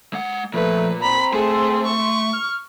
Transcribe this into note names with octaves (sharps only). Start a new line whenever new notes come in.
G#3 F#5
A#2 F3 A3 B4
C4 A#5 B5
A3 G#4 C6
C#6
F6